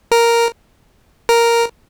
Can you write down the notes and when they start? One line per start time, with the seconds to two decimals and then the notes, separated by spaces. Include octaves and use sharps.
0.12 A#4
1.29 A#4